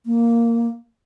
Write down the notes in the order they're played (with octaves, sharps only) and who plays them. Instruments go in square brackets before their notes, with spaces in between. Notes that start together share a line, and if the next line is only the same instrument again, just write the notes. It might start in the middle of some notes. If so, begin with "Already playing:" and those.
[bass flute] A#3